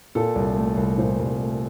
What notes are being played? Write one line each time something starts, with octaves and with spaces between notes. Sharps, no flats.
A#2 A4
C2
A3
C2
A#2 C5
C2
A3